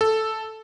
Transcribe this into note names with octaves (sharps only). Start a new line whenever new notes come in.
A4